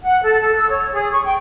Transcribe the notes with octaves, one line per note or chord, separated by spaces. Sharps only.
F#5
A4
A4
E6
C#5
G#4
C#6
G5